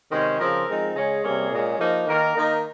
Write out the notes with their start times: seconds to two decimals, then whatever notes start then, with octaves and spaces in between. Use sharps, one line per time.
0.11 C3 D#3 G#3 C#4 C5
0.39 C#3 F3 C4 A#4
0.68 F3 G#3 C4 D#4
0.95 C#3 G#3 C#4 G#4
1.24 C3 G3 A#3 C#4
1.52 A#2 G#3 C#4
1.80 F3 A#3 D#4
2.07 D#3 A#3 D#4 A#4
2.36 D#3 A#3 D#4